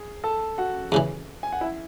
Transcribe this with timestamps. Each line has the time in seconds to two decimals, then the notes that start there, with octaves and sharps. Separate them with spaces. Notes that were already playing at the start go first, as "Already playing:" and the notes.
Already playing: G#4
0.24 A4 A5
0.58 F#4 F#5
0.92 E2 C#3 E3
1.43 G#5
1.52 F#5
1.61 E4 E5